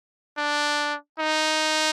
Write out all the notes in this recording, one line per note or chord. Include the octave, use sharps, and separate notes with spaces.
D4
D#4